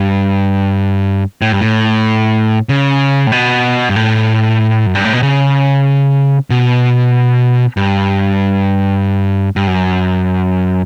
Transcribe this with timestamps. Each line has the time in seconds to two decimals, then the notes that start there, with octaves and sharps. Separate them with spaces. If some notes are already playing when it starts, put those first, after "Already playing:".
Already playing: G2
1.42 A2
1.52 G2
1.61 A2
2.69 C#3
3.27 A2
3.32 B2
3.89 G2
3.96 A2
4.86 F#2
4.95 G2
5.04 A2
5.13 B2
5.23 C#3
6.50 B2
7.77 G2
9.56 G2
9.67 F#2